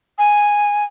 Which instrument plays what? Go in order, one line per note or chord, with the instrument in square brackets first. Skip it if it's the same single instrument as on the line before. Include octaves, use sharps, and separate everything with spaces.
[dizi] G#5